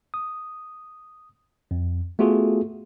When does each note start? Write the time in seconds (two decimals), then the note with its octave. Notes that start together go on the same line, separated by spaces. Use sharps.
0.14 D#6
1.71 F2
2.19 A3 B3 F4 F#4 G#4 A4